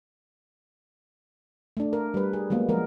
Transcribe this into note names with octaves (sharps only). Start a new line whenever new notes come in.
A3 D4
A#4
G3 B4
G#4
F#3 G#3 A#3 B3
F3 G#3 A#4